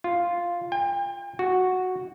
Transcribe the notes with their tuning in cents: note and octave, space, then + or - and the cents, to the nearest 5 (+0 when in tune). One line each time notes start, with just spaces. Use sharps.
F4 +0
G5 +40
F#4 -5